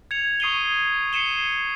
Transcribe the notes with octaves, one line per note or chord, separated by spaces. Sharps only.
G#6 C#7 F7
C#6 D#6 C7 D#7 F7 G7
C7 C#7 D#7 E7 G7